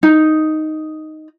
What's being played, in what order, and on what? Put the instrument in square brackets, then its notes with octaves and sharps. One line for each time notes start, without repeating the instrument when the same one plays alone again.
[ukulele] D#4